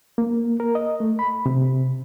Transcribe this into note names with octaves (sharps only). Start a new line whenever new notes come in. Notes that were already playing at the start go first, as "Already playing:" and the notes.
A#3
A#4
D#5
A3
B5
C3